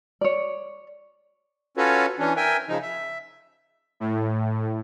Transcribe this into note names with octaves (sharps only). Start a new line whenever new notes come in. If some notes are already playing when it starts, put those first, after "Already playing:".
C#5 D5
C#4 F4 F#4 A4 B4 C#5
E3 C#4 D4
A#4 E5 G5 G#5
C#3 F3 D#4
E5
A2